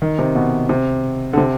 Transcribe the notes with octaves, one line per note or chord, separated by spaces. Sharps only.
D#3
C3
B2
C3
D3
C3